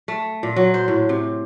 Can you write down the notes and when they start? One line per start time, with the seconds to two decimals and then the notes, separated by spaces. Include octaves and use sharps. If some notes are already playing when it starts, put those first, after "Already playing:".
0.08 A3
0.43 A#2
0.56 F#3
0.74 C5
0.88 A2
1.09 C3